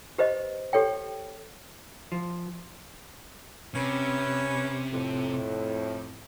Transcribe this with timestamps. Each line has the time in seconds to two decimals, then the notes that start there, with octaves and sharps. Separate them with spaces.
0.18 G4 B4 C5 D#5
0.73 G4 A4 C#5 G5
2.12 F3
3.75 C3 C#4 B4
4.93 F2 A2